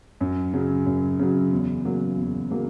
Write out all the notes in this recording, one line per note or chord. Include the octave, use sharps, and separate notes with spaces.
F#2
C#3 F#3
F#2
C#3 F#3
E2
C#3 F#3 A#3
E2
C#3 F#3 A#3